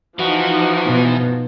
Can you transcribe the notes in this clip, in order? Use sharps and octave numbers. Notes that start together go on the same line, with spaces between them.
E3 F3 D#4 F#4
B2